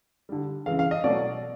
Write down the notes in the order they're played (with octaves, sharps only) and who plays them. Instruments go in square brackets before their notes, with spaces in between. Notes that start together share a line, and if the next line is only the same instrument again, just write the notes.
[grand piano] D3 G3
C#3 E3 G#3 F5
F5
D#5
B2 F#3 A3 D5